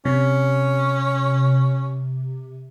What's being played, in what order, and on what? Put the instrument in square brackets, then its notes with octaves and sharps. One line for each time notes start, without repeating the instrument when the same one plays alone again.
[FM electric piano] C3 [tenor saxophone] C#4